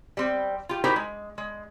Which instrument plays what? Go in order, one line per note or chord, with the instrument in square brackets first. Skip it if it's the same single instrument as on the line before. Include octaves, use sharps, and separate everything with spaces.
[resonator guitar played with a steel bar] G3 C4
F4 G4
D#4 E4 F#4 G4 A#4 C5
G#3
G#3